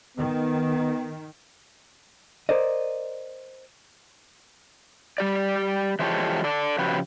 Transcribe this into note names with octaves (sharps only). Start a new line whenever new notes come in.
D#3 B3
A#4 C5 D5 D#5
G3 G4 D5
E3 F3 G#3 G4 A4 C#5
A4 D5
C#3 F3 F#4 G4 B4